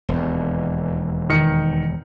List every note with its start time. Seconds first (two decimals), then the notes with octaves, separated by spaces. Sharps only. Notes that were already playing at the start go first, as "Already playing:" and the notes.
0.09 E1 D#2
1.30 D#3 C#7